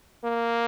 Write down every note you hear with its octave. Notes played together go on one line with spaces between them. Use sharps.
A#3